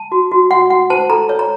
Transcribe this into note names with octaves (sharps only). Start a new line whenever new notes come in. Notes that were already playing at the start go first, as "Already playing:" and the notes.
Already playing: A5
F#4
F#4
F#4 F#5
F#4 F#5
C5 A5
A4 A#5
C#5
A#5